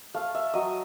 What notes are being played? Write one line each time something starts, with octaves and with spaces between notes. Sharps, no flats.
A3 F5
E5
F#3 D#5